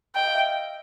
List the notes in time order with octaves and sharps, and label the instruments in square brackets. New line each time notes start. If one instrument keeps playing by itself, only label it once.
[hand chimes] D#5 [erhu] G5
[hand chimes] F5
E5